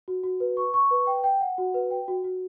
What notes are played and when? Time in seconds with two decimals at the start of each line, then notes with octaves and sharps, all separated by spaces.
0.08 F#4
0.24 F#4
0.40 B4
0.57 C#6
0.74 C#6
0.91 B4
1.07 G5
1.24 G5
1.41 F#5
1.58 F#4
1.74 B4
1.91 G5
2.08 F#4
2.24 F#4